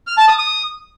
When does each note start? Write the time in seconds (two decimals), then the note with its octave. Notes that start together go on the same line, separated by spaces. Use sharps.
0.07 F6
0.17 A5
0.28 D#6
0.38 D#6